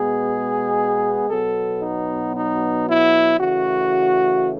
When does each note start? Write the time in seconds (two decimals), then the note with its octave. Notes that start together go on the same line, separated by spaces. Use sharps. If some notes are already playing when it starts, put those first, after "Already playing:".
Already playing: B2 G#3 B3 G#4
1.28 B2 F#3 B3 A4
1.81 D#4
2.34 D#4
2.87 E4
3.39 C#3 E3 A3 F#4